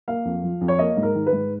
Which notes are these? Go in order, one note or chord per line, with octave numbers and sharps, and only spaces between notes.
A#3 F5
F2
F3
F2
C#5
A#3 D#5
G#2
A#4
D#3
B4
G#2